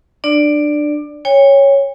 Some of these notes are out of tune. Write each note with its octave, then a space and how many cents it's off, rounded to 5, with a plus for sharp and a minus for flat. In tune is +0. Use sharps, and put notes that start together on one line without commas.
D4 +25 D5 +0
C#5 +0 G5 +45